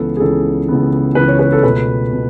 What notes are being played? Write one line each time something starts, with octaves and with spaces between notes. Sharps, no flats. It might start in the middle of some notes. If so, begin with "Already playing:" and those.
Already playing: C#2 C#3 E3 B3 A4
G#4
C#2 C#3 E3 B3 A4
C#2 C#3 E3 B3
C#2 C#3 E3 B3 B4
C#5
B4
A4
C#2 B2 A3 B4
B2